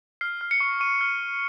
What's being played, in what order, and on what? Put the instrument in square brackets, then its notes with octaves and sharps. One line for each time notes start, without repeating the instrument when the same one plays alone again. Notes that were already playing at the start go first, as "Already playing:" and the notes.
[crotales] F6 C7
F6
C#7
C#6
C#6 D#7
F6